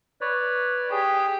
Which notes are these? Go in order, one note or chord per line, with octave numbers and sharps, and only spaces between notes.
B4 C#5 D5
G4 G#4